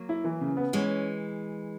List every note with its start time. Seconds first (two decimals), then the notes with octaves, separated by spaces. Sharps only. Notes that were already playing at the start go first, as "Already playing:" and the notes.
Already playing: F#3 A#3
0.09 E4
0.24 E3
0.41 C#3
0.57 B3
0.73 E3 G#3 C#4